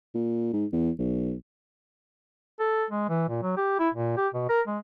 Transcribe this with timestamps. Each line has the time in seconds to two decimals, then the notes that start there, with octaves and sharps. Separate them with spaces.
0.15 A#2
0.53 G#2
0.73 E2
0.99 B1
2.60 A4
2.90 G#3
3.09 E3
3.29 A#2
3.43 F#3
3.57 G4
3.79 E4
3.94 A#2
4.17 G4
4.34 B2
4.49 A#4
4.67 G#3